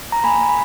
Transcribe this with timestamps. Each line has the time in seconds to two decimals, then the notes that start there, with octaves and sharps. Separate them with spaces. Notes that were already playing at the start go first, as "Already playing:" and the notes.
0.12 A#5
0.24 A#3 G#5 B5
0.49 B5